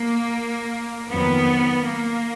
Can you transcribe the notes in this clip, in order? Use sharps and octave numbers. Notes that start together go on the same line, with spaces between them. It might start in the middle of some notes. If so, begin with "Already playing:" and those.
Already playing: A#3
F2 D#3 F#3 B3
A#3